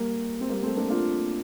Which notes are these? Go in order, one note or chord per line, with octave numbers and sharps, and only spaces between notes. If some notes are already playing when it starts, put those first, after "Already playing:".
Already playing: G3 A#3
C4
G3 A#3
A3 C4
A#3 D4
D4 F4